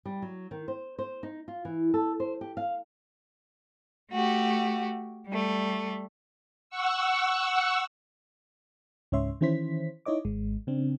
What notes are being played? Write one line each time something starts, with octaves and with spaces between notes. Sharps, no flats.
G3
F#3
D#3
C5
C5
D#4
F4
E3
A4
C5
G4
F5
A3 F#4 G4
G3 A3
F#5 C#6 E6
C#2 G#2 C#4 C#5 E5 C6
D#3 E3 C#4 E4 C5 B6
D#4 E4 C#5 D#5 D6
G#1 G#3
C#3 C4 D4